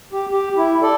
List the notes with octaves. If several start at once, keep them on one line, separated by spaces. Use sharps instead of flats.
G4
G4
E4
A4 D5